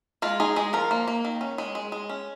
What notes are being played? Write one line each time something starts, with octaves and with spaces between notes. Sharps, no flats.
G#3 F4
D#4 G#4
G#3 G#4
F3 A#4
A#3
A#3
D#3
C#4
G#3
G#3
G#3
C#4